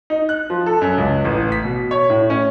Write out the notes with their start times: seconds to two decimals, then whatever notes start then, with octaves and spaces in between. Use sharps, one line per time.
0.10 D#4
0.29 F#6
0.50 F3
0.66 A4
0.81 F#2
0.98 C#2
1.25 A1
1.52 B6
1.64 B2
1.91 C#5
2.10 A2
2.30 C#4